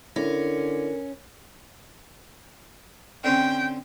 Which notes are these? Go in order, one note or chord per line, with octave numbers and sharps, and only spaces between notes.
D3 C#4 E4 A#4
D3 C4 C#4 G5